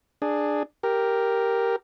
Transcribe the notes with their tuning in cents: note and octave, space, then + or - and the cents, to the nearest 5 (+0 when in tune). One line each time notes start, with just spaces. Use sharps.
D4 +15 G#4 +0
G4 +0 A#4 +0